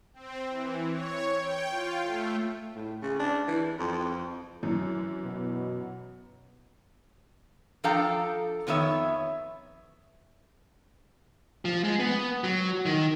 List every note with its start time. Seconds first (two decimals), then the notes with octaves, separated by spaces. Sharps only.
0.14 C4
0.49 E3
0.91 C#5
1.37 G5
1.70 F4
2.01 A3
2.75 A2
3.02 C#3
3.19 D4
3.48 E3
3.79 F2
4.63 F#2 E3
5.23 B2
7.84 F3 D4 A4 F5 G5 A#5
8.67 F2 D#3 B3 C#5 E5
11.65 F3
11.84 G#3
12.00 B3
12.44 F#3
12.86 D#3